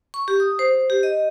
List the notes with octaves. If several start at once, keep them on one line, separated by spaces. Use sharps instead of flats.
C#6
G4
D#6
C5
G4
D#5